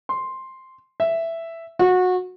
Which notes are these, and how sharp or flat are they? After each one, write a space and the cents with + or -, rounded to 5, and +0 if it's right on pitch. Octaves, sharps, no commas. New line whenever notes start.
C6 +5
E5 +5
F#4 -20